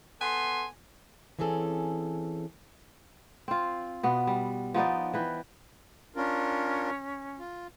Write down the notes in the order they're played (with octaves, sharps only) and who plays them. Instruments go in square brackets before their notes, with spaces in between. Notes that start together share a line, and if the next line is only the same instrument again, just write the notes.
[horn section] B3 A4 G#5 C6
[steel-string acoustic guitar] E3 C4 C#4 G#4 A4
[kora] C4 F4
B2 B3
G3
F3 B3 D#4 D5
E3 B4 G5
[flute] C#4 [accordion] D4 F4 A#4
[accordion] F4